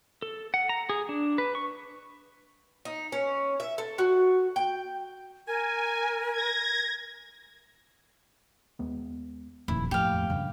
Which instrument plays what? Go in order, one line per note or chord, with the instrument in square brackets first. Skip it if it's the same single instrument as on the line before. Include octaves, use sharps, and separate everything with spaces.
[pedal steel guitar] A4
F#5
A#5
G#4
D4
B4
C#6
[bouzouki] D#4
C#4
E5
A4
F#4
G5
[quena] A#4 [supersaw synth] G#5
[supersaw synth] G#6 A#6
[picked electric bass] D#2 G#3 B3
[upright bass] D#1 [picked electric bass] E2 G2 F3 [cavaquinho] E4
[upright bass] F2 A2 [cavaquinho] G4 F5
[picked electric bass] D#1 C#3 [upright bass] G2